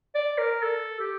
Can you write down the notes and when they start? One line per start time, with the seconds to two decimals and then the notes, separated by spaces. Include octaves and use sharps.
0.15 D5
0.38 A#4
0.63 A4
1.00 G4